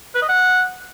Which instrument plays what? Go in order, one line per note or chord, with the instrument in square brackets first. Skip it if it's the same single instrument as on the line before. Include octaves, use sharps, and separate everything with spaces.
[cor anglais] B4
D#5
F#5